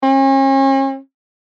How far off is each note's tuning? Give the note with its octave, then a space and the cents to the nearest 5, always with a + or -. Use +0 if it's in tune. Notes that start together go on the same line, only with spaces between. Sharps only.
C#4 -40